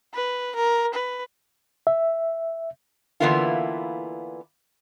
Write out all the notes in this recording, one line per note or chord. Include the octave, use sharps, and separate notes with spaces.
B4
A#4
B4
E5
D3 E3 A#3 B3 E4 F4